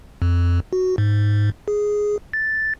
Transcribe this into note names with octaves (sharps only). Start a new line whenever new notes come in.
F2
F#4
G#2
G#4
A6